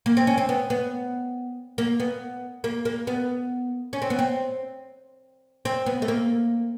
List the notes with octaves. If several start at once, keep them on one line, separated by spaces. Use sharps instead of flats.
A#3
C4
C#4
C4
B3
B3
A#3
B3
A#3
A#3
B3
C#4
C4
B3
C4
C4
B3
A3
A#3